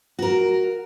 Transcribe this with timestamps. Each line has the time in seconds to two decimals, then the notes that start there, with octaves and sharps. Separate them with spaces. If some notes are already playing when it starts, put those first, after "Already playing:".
0.19 F#4 A#4